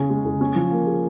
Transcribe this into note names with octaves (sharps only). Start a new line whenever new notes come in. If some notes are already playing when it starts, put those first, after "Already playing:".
Already playing: C#3 C#4 G#4
G#3
C#3
C#4
F3
A#3
G#4